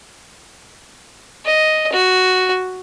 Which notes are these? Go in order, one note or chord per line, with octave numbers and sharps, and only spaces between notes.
D#5
F#4